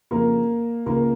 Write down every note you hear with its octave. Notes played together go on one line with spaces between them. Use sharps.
F2 C#3 A#3 A#4
C#2 C#3 A#3 A#4